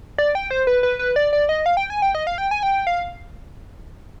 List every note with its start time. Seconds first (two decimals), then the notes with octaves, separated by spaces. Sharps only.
0.18 D5
0.35 G5
0.51 C5
0.67 B4
0.83 B4
0.99 B4
1.16 D5
1.33 D5
1.49 D#5
1.66 F5
1.77 G5
1.90 G#5
2.02 G5
2.15 D#5
2.27 F5
2.38 G5
2.51 G#5
2.63 G5
2.87 F5